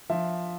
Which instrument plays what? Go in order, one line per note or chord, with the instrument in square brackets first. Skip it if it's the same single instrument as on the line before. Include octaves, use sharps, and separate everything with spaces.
[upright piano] F3 E5